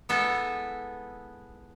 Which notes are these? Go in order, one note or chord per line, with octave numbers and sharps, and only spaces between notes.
G#3 B3 E4 A4